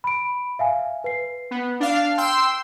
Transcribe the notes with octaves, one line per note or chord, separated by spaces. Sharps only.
B5 D7
E5 F5 G#5
B4 C7
B3
D4 F5
G5 C6 E6